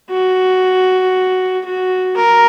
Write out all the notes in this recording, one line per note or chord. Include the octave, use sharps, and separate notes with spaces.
F#4
F#4
A#4